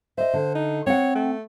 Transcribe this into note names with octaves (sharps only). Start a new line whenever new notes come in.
C5 D#5 E5
D3
D#4
C4 C#5 F#5
A3